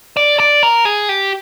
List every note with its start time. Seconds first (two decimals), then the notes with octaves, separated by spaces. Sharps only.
0.17 D5
0.40 D5
0.63 A#4
0.85 G#4
1.09 G4